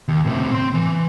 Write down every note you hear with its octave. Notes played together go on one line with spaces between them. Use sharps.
D#2
A2 C3
C4 C6
E3